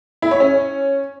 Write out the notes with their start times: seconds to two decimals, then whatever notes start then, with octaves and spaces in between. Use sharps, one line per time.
0.22 E4
0.31 C#5
0.40 C#4